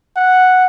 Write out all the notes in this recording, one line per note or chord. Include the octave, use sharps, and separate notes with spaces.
F#5